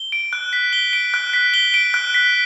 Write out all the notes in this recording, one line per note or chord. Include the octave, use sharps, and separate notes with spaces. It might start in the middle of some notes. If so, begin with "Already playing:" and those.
Already playing: G7
D7
F#6
B6
G7
D7
F#6
B6
G7
D7
F#6
B6